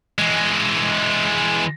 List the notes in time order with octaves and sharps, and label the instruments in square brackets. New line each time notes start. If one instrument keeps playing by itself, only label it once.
[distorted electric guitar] E3 G#3